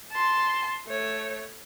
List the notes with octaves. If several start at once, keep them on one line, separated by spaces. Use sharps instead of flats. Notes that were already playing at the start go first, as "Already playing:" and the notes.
A5 C6
A3 C#5